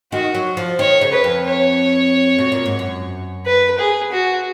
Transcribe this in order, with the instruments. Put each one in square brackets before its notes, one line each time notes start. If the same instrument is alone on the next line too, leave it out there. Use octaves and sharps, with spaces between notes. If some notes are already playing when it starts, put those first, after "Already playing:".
[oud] D#3 [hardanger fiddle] F#4
[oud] F#3
F3
[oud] D#3 [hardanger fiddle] C#5
[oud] C#3
[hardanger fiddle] B4
[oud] F2
[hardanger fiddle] C#5
[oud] B2
A#2
G#2
F#2
[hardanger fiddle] B4
G#4
F#4